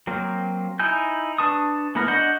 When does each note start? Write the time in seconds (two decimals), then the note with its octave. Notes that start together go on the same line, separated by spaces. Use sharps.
0.07 F#3 A#3 C4
0.79 D#4 E4 G#5 G6
1.38 D4 B4 A5 C#6 D#6
1.95 E3 A#3 B3 E4 A#4
2.08 D4 F#4 D#5 F#5 G6